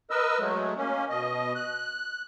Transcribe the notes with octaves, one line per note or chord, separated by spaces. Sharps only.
A#4 B4 D#5 E6
F#3 G#3 A3
A#3 C#4
B2 D#5
F#6